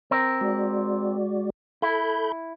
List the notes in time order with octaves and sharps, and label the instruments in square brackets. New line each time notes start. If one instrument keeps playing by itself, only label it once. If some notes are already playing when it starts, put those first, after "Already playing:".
[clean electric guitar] C4 A#4
[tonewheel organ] G#3 F#4 D5
[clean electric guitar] E4 [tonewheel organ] A4 B5 G6